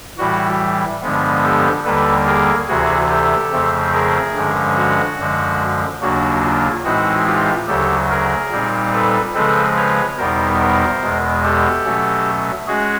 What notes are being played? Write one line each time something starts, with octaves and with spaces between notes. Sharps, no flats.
A2 E3 G3 F#4
G2 D3 F3 G#3 B3
G4 A4
D#2 D3 G3 A#3 A4 B4
G#4 A#4
D2 C3 E3 F#4 G#4
G4 A4
F2 C#3 F3 A3 C4
G#4 A#4
G2 D3 F3 G#3 C#4
F#4
F#2 D3 F3 G#3
D#2 C#3 F#3 A#3 D4 F#4
F4
A2 E3 G#3 C4 D#4 F#4
F4 G4
D2 C#3 F#3 G4 A4
G#4 A#4
A#2 G3 C4 D#4
A4 B4
C#3 F3 G#3 C4 A4 B4
B4 C#5
E2 B2 G3 B3 D#4 A#4 C5
A#4 C5
E2 B2 G#3
G4 A4
B2 F#3 A3 C#4
G#3 C#4 F#4 G#4